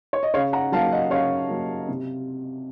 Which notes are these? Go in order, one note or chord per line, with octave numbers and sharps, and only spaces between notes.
C#5
D#5
C#3 C#5 F5
F#5 A#5
F#3 A#3 C#4 F5 A5
D#5 F#5
C#3 C#5 F5
F#3 A#3 C#4
C3